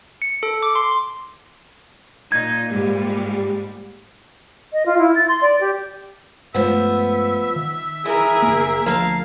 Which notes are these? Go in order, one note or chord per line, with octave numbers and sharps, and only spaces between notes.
C#7
A4
D6
C6
A#2 D#4 G#6
G#2 G3
D#5
F4
E4
A6
C6
D5
G4
G2 F3 G#3 A3 B3 E5
D#3
E4 G#4 A#4
F#1 F#2 A#3
D2 F3 A#3 F5 A5